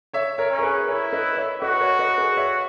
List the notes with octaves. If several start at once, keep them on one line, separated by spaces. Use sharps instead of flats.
C#5 E5
A#4 C#5
C#4
A#4
G#4 B4
E4 A#4 C#5
B4 D#5
C#5 E5
F#4 B4 D#5
A#4 C#5
B4 D#5
G#4 B4
C#5 E5